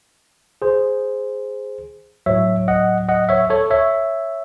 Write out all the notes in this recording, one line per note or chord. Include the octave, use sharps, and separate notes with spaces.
G#4 C5
A2 F#3 C#5 E5
D#5 F#5
D#5 F#5
C#5 E5
A4 C#5
C#5 E5